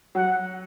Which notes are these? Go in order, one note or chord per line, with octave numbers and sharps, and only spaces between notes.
F#3 F#5